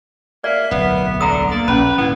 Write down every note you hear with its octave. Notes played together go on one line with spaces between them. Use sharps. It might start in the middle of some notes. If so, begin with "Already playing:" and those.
A#3 D5 E5
D1 B1 B3
D3 A#5 D#6
A#3 D5
A#1 C#4 B4 B5
G#2 D3 B3 E4